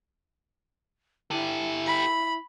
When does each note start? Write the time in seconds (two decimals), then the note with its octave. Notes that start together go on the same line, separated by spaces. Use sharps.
1.31 E4 G4 A4
1.87 B5